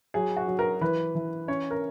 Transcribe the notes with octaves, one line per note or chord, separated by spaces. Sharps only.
F#3 G#4
F#4
F#3
A#4
E3 B4
E3
C#4 C#5
A#4